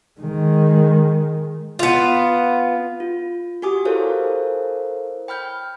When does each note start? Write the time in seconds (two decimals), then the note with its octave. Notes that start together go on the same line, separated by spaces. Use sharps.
0.21 D#3 G#3
1.79 B3 F4
3.00 F4
3.62 F#4 G4 G#5 D6 D#6
3.85 E4 A4 A#4 C5 C#5 F5
5.28 G5 B5 F6 G6